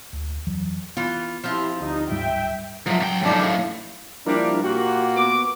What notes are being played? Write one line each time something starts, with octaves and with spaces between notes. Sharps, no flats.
D2
F2 E3 F#3
E3 B3 F4
F3 C4 E4 F4 G4
D2 G3 D#4 D#5
D1 G#2 G3 E5 G5
F3 F#3 E5
C#2 F#3 G5
F#2 A2 F3 D4 D#4
E4 F5
F3 G3 A#3 D4 E4 A#4
A#2 A#3 F#4 G4
B3 D6